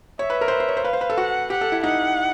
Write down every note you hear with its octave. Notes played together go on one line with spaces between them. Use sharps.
C#5 E5
B4
A#4
C5
B4
C5
C#5
C5
B4 F5
C5
B4
A4
F#4 F#5
G4 F#5
A4
E4
D#4 F#5